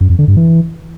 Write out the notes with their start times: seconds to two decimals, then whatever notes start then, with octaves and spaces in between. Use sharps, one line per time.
0.01 F#2
0.10 F2
0.19 D3
0.28 G2
0.37 E3